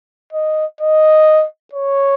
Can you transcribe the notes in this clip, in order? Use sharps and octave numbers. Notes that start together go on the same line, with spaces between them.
D#5
D#5
C#5